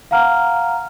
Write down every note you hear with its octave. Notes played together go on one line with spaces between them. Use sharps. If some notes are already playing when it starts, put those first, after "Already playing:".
F5 F#5 A#5 F6